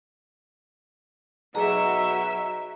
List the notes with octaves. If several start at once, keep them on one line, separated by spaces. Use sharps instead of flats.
B2 F#3 D#4 G#4 E5 A#5